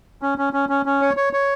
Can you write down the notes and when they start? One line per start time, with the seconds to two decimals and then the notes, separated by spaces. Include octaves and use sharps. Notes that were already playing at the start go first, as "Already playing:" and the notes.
0.22 C#4
0.38 C#4
0.53 C#4
0.69 C#4
0.86 C#4
1.01 C#5
1.17 C#5
1.33 C#5